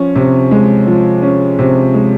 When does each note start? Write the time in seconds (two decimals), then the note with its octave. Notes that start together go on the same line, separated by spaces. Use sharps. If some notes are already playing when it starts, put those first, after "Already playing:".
Already playing: F3 C#4
0.15 C3
0.51 G#3
0.87 F3
1.22 C#4
1.59 C3
1.94 G#3